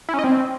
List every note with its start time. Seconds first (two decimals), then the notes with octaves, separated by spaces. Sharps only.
0.09 E4
0.14 C#4
0.19 D#5
0.24 C4